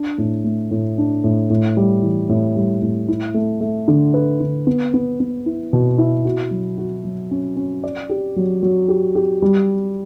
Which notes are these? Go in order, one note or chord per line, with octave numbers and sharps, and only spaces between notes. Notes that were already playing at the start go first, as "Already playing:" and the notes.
Already playing: D4
A2
A3
A2
D4
A2
A2
G3
E3
A2
G3
A2
E4
A3
A3
D3
B4
D3
B3
B3
B3
E4
B2
E4
F#4
F#3
F#4
F#3
C#4
C#4
D5
G4
F#3
F#3
G4
G4
G3